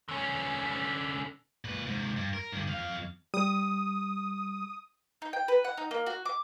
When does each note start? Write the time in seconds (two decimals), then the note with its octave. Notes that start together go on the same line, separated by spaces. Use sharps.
0.09 D3 C#4
1.65 A#2 B4
1.86 G#2 C3
2.17 G2
2.34 A#4
2.52 G2 D3
2.68 F2 F5
3.34 G3 D#6
5.22 D#4
5.33 G5
5.48 B4
5.64 F#5
5.77 D#4
5.91 A#3
6.06 F#4
6.25 D6